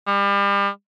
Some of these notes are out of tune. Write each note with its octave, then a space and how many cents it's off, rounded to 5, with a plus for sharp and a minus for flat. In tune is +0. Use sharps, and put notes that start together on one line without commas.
G3 +35